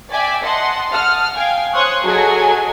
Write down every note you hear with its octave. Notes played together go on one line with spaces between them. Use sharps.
D5 E5 G5 G#5 D6
D#5 F#5 A5 C6
F#5 A5 D#6 F6
F5 G5 G#5
C5 C#5 C6 C#6 D#6 F#6
F#3 F#4 G#4 A4 D#5 G#5